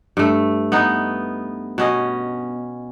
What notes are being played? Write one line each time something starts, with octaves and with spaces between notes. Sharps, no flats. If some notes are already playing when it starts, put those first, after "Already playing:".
G2 A3
B3 D#4
B2 C#4 D#5